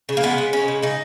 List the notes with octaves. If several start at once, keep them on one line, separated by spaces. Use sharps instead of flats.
C#3
A#3
G#3 B3
C#3
G#3 C#4
C#3
C#3 D#4